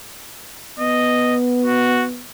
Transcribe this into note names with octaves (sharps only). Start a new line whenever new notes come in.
B3 D#5
F#4